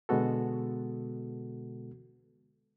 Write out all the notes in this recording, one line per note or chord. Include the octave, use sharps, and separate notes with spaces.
B2 D3 G#3 B3 F#4 A4